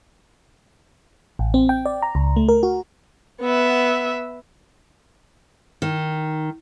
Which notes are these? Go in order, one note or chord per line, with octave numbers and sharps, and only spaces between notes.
A1
C4
G5
D5
A#5
C#2
A3
A#4
F#4
B3 E5
D#3